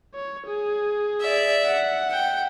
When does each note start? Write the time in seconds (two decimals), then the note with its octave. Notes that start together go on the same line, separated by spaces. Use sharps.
0.14 C#5
0.46 G#4
1.20 D5 E5
1.66 F#5
2.11 G5